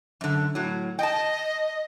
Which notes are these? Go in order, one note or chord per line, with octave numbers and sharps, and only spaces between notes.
F#2 D3
A2 F#3
D#5 G5 A5